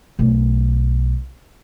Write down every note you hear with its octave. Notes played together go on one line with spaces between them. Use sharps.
B1 A3